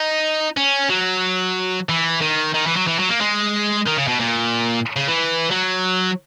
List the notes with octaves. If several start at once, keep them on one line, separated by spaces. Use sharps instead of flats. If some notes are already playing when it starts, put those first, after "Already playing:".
Already playing: D#4
C#4
F#3
E3
D#3
D#3
E3
F#3
E3
F#3
A#3
G#3
D#3
C#3
B2
A#2
C#3
E3
F#3